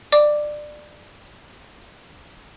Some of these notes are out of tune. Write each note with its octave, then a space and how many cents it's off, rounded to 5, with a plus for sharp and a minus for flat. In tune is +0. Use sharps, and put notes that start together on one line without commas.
D5 +20 D6 +0